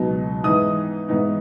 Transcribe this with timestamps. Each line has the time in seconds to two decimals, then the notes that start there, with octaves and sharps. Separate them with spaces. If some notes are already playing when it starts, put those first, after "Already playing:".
Already playing: C#2 B2 F#3 B3 D#4
0.44 G#2 E3 B3 D#4 D#6
1.09 G#2 E3 B3 D#4